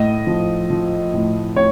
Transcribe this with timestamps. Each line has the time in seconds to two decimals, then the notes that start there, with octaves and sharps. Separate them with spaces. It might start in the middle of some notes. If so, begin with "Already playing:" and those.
Already playing: A2 D#5
0.27 F3
0.70 F3
1.13 A2
1.56 A2 C#5